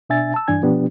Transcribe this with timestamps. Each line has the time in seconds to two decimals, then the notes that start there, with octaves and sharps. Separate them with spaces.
0.10 B2 D4 E5 G#5 A6
0.34 A5 E6
0.48 G2 E3 D4 G#5 G#6
0.62 B2 F3 B3 D4 G4